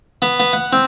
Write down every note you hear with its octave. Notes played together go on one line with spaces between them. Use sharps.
B3
B3
F#5
C4